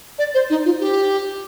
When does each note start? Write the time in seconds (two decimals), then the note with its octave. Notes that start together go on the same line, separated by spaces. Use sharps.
0.19 D5
0.34 C5
0.50 D#4
0.65 F4
0.80 G4